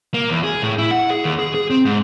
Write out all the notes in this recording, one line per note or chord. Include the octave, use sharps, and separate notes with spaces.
A#3
E2
G#4
A2
E4
F#5
G#4
D#2
G#4
G#4
C4
G#2